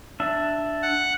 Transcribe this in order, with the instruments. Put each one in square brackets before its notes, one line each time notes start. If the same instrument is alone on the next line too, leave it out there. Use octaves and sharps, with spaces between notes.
[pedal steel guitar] D4 E5
[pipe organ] F#5